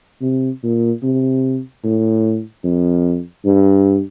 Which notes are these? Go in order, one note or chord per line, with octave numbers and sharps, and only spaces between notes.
C3
A#2
C3
A2
F2
G2